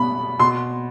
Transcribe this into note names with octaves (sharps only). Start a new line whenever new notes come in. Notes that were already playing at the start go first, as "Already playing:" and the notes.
Already playing: B2 G3 B3 B5
B2 C6